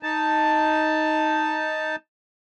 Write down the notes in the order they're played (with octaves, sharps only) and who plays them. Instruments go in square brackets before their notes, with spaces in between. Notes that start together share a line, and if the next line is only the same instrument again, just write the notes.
[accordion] D#4 A5